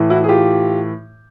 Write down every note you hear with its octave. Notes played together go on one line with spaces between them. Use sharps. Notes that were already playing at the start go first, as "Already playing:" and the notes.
Already playing: A2 E3
E4 F#4
G#4
F4 G4